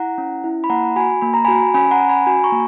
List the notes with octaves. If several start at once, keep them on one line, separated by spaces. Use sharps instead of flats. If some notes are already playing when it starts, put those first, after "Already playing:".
Already playing: E4 F#5 A#5
C#4
E4
B5
A#3 F#5 A#5
F#4 G#5 B5
A#3 B5
A#5
F#4 G#5 B5
C#4 G#5 B5
F#5 A#5
C#4
G#5 B5
F#4 G#5 B5
A#5 C#6
A#3